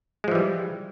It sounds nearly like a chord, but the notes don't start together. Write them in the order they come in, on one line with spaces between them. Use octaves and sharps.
G#3 F3 E3 G3